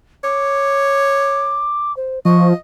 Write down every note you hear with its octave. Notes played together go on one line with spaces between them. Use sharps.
C#5 D6
C5
F3 D#5 C#6